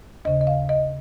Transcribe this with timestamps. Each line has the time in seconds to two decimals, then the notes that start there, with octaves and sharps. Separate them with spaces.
0.25 D#2 C#3 D#5
0.41 D#5
0.47 F5
0.69 D#5